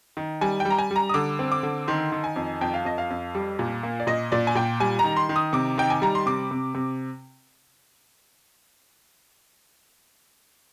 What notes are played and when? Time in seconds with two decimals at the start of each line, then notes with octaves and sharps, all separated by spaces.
0.17 D#3
0.41 G3 G#5
0.60 G5
0.65 G3
0.70 A#5
0.79 G#5
0.91 G3
0.96 A#5
1.09 D#6
1.14 D3 D6
1.39 C4
1.52 D6
1.63 D3
1.88 D#3 C6
2.12 D#3
2.24 G#5
2.36 F2
2.61 F2 G5
2.74 F5
2.85 F2 D#5
2.98 F5
3.10 F2
3.35 G3
3.59 A#2
3.83 A#3
4.00 D5
4.07 A#2 D#5
4.32 A#2 D5
4.47 G#5
4.55 A#2 G5
4.80 G3 G#5
4.99 A#5
5.04 D#3
5.17 C6
5.29 D#3
5.36 D#6
5.53 C3 D6
5.78 D#3 G5
5.90 G#5
6.02 G3 A#5
6.15 C6
6.26 C3 D6
6.51 C3
6.75 C3